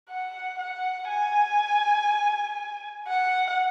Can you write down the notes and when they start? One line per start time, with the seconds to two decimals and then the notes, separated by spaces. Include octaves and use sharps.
0.09 F#5
0.59 F#5
1.08 G#5
3.07 F#5